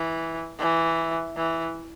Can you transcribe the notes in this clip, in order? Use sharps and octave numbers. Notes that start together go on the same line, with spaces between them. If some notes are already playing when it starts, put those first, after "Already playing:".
Already playing: E3
E3
E3